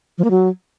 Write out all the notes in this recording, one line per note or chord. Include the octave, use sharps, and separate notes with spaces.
F3
A#3
F#3